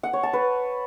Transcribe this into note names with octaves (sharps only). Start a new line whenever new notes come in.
F#5
C#5
A5
B4